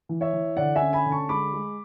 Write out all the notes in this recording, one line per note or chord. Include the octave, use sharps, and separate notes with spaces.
E3
C#5 E5
E3
D3 D5 F#5
E5 G#5
C#4
G#5 B5
D3
A5 C#6
G#3 B5 D6
G#3